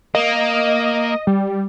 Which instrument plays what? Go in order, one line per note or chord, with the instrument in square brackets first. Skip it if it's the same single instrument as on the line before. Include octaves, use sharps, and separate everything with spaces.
[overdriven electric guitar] A#3 [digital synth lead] D#5
[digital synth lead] G3